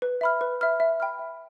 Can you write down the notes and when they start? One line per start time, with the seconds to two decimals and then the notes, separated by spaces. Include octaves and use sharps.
0.02 B4
0.21 E5 B5 F6
0.41 B4
0.61 E5 B5 F6
0.80 E5
1.00 G5 B5 F6
1.19 E5